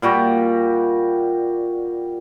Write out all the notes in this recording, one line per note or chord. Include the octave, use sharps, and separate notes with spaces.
A#2 G3 F#4 G4